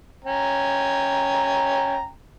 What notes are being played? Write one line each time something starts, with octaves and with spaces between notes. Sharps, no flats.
C#4 G5 A#5